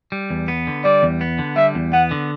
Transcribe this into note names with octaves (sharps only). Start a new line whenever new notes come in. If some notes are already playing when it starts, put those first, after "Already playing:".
G3
E2
B3
D3
G3 D5
E2
B3
D3
G3 E5
E2
B3 F#5
D3